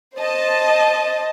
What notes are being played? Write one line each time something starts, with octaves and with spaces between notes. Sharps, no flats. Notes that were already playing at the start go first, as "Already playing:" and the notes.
C5 D#5 A5